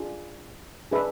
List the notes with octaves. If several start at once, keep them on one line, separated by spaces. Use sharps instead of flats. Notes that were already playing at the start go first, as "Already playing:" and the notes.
Already playing: D4 F4 G#4
D4 G#4 B4 E5